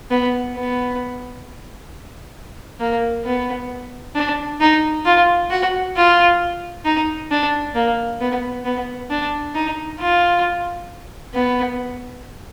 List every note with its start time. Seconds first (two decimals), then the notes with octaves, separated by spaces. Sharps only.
0.11 B3
0.56 B3
2.80 A#3
3.25 B3
4.15 D4
4.60 D#4
5.06 F4
5.51 F#4
5.96 F4
6.85 D#4
7.31 D4
7.75 A#3
8.20 B3
8.65 B3
9.10 D4
9.55 D#4
10.00 F4
11.34 B3